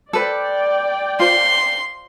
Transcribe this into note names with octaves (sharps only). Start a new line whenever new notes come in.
A4 B4 C5 D5 G5
F4 C5 C6